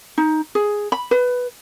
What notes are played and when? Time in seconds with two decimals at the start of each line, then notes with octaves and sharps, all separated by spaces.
0.18 D#4
0.55 G#4
0.92 B5
1.11 B4